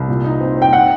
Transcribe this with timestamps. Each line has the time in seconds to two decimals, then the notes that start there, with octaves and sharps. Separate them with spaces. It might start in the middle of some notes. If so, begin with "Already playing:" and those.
Already playing: C2
0.08 A#2
0.24 D#4
0.41 C4
0.57 C4 G5
0.73 D#4 F#5